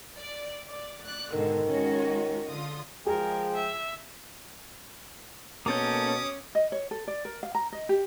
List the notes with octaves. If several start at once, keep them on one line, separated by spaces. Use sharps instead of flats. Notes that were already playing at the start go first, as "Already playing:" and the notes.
D5
D5
D5 F#6
G#2 B2 D3 D#3
G#3 C#4 F#4
D3 F4 D#6
F3 G#3 G#4 A#4 G5
E5
B2 A#3 C#4 A4 D6 D#6 G6
D#5
C#5
A4
D5
A#4
F5
A#5
D#5
G4